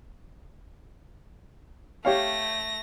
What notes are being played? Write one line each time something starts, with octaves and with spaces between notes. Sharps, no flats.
A3 G4 C#5 F5 A#6